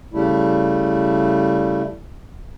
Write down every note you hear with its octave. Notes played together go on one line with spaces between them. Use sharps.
C#3 G3 A3 E4